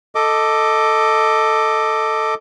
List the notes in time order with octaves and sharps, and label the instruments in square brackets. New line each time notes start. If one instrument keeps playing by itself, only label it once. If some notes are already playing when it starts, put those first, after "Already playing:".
[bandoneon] A4 D#5 D6